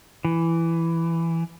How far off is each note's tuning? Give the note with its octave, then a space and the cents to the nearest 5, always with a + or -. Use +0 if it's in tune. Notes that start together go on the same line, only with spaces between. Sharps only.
E3 +10